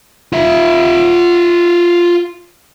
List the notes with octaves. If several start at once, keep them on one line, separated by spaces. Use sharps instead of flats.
F4 E5